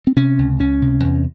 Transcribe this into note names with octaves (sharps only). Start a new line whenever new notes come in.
C4
C3 C#4
C#2
C#2 C#4
C3
E2